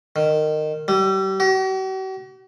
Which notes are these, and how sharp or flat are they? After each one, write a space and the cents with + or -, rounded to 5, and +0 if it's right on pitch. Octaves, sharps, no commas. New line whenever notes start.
D#3 -20
G3 -35
F#4 +45